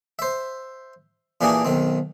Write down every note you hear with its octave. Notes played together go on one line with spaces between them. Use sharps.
C5 E5
A#2 E3 A#3 D4 G4 G#4
B1 D#3 C4